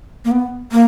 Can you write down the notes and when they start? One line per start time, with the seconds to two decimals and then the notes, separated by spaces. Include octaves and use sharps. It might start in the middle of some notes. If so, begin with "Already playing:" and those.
0.25 A#3
0.31 B3
0.72 A#3